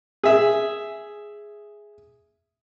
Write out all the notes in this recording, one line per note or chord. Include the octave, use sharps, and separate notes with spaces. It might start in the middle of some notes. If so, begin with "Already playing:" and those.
G#4 E5